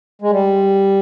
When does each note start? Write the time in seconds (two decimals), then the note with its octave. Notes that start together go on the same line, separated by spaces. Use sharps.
0.22 G#3
0.31 G3